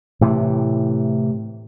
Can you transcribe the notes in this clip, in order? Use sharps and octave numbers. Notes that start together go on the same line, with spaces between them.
A2 C3 E3